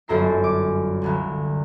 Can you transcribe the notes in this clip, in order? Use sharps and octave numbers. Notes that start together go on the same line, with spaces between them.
G1 F#2 A4 A#5 C7
D6
G1 C2 D3